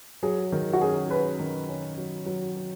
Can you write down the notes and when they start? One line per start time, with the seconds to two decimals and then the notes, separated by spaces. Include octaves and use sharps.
0.23 F#3 G#4
0.52 D#3 A#4
0.73 F#4
0.81 C#4 G#4
1.10 C#4 B4
1.39 D#3
1.69 C#4
1.98 F#3
2.26 F#3
2.56 F#3